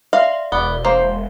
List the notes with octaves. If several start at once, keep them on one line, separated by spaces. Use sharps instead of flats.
D5 E5 F5 C6
E1 B3 D5 G7
A#3 C5